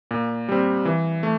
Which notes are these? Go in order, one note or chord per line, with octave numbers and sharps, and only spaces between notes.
A#2
G3 C4
E3
A3